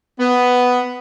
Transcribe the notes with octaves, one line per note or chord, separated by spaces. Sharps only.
B3